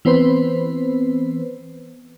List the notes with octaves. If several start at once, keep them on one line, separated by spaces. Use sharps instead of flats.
E3 B3 C4 B4 C5